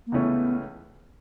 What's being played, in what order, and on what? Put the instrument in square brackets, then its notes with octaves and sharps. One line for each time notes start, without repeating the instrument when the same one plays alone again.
[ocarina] A#3
[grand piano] C#2 C#3 E3 A3 C#4 [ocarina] B3